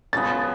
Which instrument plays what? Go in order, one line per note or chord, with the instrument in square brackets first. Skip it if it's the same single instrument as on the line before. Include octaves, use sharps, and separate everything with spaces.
[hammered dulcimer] C#3 F3 B3 [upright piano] A6